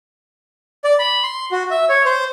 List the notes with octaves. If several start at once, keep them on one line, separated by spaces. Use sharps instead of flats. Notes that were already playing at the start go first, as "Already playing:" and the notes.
D5
B5
C6
F#4
E5
C#5
C5